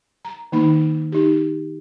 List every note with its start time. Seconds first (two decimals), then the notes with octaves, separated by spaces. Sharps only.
0.25 A#5
0.52 D#3 A#3 D#4 B5
1.12 D#4 G4